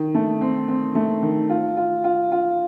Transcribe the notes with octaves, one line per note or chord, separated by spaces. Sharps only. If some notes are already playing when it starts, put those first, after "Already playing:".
Already playing: D#3
A3
C4
C4
A3
D#3
F4
F4
F4
F4